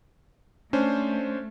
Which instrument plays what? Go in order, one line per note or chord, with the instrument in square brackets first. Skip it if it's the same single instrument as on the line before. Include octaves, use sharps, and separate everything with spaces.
[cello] A3 [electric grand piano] C#4 D4 C5